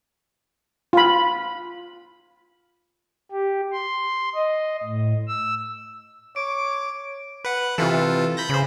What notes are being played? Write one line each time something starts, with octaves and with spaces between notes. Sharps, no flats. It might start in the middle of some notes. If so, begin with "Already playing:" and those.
F4 B5
G4
C6
D#5
A2
E6
C#5 D6 D7
B4 F#5
C3 E3 F4 A4
B5 G6 A#6
C#3 C5 B5